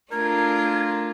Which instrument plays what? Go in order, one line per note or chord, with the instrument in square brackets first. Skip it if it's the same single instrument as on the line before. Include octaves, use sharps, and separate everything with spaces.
[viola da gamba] A3 D4 F4 [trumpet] A#4 [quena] G#6